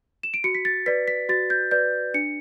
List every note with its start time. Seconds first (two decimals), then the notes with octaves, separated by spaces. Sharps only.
0.23 E7
0.34 D7
0.44 F#4 C#7
0.55 B6
0.65 A6
0.86 B4 D5 B6
1.08 B6
1.29 F#4 A6
1.50 G6
1.71 B4 D5 G6
2.14 D4 C#7